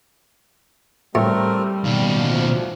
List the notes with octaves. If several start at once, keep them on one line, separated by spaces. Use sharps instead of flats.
A2 G3 A3 C4 A#4
D#2 B2 F5
D2 F3